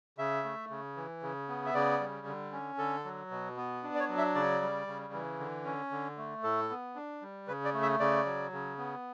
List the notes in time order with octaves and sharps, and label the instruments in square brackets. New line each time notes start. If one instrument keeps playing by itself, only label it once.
[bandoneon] C#3 E5
A3
C#3
E3
C#3
B3
E5
C#3 D5
G3
D3
C#4
D3 A4
F#3
B2
B3
D4
D5
C#5
F#3
E5
C#3 D5
G3
C#3
E3
D3
C#4
D3
A3
A2 A4
B3
D4
G3
C#3 B4
D5
A3
E5
C#3 D5
F#3
C#3
B3